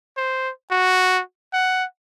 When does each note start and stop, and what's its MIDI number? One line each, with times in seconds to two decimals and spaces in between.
0.17 0.51 72
0.71 1.21 66
1.53 1.85 78